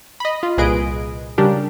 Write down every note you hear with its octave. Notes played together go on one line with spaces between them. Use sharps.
D#5 B5
F4
C2 A#2 G#4 B4 D#5 D7
C#3 G3 D4 G4 A#4